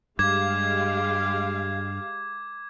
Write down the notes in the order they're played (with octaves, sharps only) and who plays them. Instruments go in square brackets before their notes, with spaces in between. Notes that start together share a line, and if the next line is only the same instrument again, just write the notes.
[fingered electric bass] G2 [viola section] G#3 G4 F5 [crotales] D6 G#6